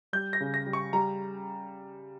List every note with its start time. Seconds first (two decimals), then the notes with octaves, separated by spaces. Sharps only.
0.13 G3 G6
0.33 A#6
0.40 C#3
0.54 A#6
0.67 G3
0.73 C#6
0.93 G3 A#5